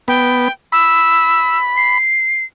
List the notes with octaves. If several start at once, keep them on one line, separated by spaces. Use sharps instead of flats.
B3 G5
B5 E6
C7